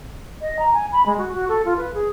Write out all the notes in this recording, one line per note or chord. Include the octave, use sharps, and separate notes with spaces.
D#5
A#5
G#5
B5
G#3
F#4
F#4
A4
F4
B4
G#4